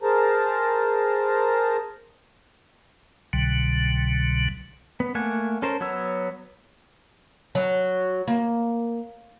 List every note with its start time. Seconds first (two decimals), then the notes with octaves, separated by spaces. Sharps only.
0.02 G#4 A#4 C5 A5 A#5
3.33 C2 B2 D3 F#3
5.00 B3
5.15 A3 A#3 F#5 G#5
5.62 C#4 A4 A#4 C5
5.81 F#3 B3 C#5 E6
7.55 F#3
8.28 A#3